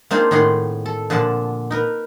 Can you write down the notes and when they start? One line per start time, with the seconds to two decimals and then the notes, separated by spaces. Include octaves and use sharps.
0.11 A#3 C4 D4 D#4 F4 G#4
0.31 A2 D#3 G#4 F#5 C6
0.86 A4
1.10 A#2 D3 F3 D4 F#5 A5
1.71 D#4 A#4 B4